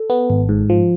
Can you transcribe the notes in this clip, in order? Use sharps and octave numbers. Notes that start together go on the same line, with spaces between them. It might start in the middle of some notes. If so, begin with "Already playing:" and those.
Already playing: A4
B3
G#1
G#2
F3